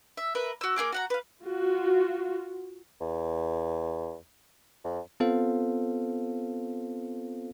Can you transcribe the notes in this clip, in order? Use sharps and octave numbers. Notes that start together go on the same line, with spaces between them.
E5
A#4 B4 E5
F#4 E6
A#3 D4 G#4 D6
F#4 F#5 A#5
B4 F5
F4 F#4
E2
F2
B3 C4 F4 A4 C5 F5